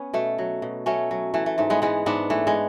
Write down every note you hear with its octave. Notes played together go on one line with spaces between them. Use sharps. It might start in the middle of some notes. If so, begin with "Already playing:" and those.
Already playing: B3 C#4
B2 A3
F#3
B2
F#3 A3 C#4
F#3
E3 A3
A3
G#2 A3
G#3 B3
E3 G#3 B3
G#2 B3 D4
E3 A3
G#3 B3